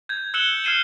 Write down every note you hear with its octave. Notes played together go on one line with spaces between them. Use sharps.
G6 G#6
E6 F#6 C#7 E7 F#7 G7
F6 G#6 C7 D#7 E7